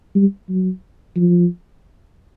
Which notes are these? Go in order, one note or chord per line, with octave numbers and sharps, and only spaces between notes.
G3
F#3
F3